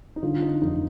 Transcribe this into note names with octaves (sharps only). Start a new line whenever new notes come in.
D#4
D3 F4
D#4
F1 D#4